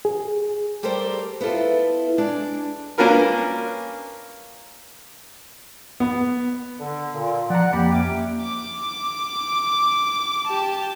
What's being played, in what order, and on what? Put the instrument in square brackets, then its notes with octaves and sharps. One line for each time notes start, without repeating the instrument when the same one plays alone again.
[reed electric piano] G#4
[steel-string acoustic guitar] G3 G4 A4 A#4 C5 D5
B3 E4 F4 A4
G#3 D4 D5
[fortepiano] A#3 C#4 D4 F4 A#4 B4
[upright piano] B3
[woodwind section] D3
A#2
[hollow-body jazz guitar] F3 A#5 [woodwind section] D5 F#5
[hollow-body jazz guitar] F2 B5 [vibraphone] A#3 [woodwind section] G4
[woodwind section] C3 C#4 D6
[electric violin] D6
G4 A5